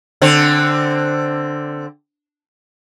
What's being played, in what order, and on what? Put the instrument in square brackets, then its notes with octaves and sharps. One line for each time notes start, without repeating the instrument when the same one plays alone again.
[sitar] D3 C4